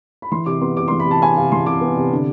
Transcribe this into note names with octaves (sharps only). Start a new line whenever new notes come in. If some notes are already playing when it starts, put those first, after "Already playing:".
B5
E3 C6
C3 D6
B3 C6
C3 D6
E3 C6
B5
C3 A5
B3 G#5
C3 F5
E3 C6
C3 D6
B3
C3
D3